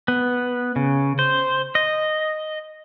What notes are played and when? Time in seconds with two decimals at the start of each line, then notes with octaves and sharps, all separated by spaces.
0.08 B3
0.76 C#3
1.19 C5
1.75 D#5